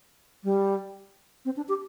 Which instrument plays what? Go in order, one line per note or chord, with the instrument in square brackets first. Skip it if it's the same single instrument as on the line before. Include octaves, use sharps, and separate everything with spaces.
[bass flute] G3
C4
D4
G4